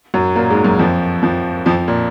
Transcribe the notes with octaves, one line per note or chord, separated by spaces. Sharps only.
F#2 F#3
A#2 A#3
G#2 G#3
F#2 F#3
F2 F3
F2 F3
F2 F3
A#2